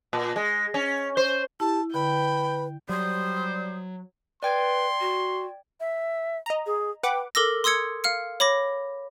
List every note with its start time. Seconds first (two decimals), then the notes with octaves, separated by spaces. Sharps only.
0.13 A#2
0.36 G#3
0.74 C#4
1.17 C5
1.60 E4 G4 A5
1.94 D3 B4 G5 B5
2.89 F#3 G3 C5 D#6
4.43 B4 D5 G5 C6 G#6
5.00 F#4
5.80 E5
6.46 D#5 A#5
6.66 G#4
7.03 B4 F#5 G5 D6
7.35 A4 A#4 D6 E6 A#6
7.64 C6 D#6 E6 G#6 C#7
8.04 F5 F6 C#7
8.40 C#5 B5 D6 A#6